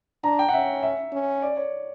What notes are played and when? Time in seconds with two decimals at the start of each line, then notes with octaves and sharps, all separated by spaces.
0.24 D4 A#5
0.39 G5
0.49 F#5
0.53 C#4 E5
0.83 E5
1.13 C#4
1.42 D5
1.57 C#5